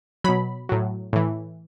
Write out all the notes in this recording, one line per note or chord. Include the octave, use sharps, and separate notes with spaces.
B2 F#3 B5
A2 F#3
A2 E3